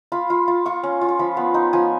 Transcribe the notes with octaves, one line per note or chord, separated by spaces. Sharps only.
F4 B5
F4
F4
F4 C#6
C#4
F4
C#6
F3 B5
B3
D#4
F3 G#5